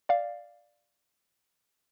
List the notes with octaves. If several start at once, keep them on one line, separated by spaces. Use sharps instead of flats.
D5 F5